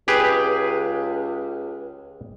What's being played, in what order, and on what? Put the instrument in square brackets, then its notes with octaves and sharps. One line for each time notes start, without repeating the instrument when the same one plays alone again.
[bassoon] C#2 [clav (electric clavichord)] G4 G#4 B4